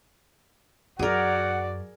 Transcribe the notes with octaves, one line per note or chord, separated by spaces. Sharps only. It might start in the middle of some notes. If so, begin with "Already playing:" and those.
F#2 F#4 G#4 A#4 D5 F#5